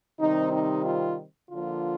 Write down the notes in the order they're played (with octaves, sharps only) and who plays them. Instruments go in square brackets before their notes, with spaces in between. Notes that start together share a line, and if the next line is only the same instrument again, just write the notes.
[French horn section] C3 D#3 G3 C4 D#4
D#4
F4
D3 F3 A#3 F4